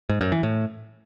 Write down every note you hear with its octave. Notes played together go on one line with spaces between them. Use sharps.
G#2
F#2
E3
A2